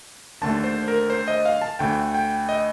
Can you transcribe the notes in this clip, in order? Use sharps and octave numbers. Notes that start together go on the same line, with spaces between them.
D#2 D3 A3 A5
C5
A#4
C5
D#5
F5
A5
D2 D3 A3 G5
G5
D#5